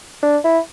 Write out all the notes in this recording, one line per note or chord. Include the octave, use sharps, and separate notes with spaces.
D4
E4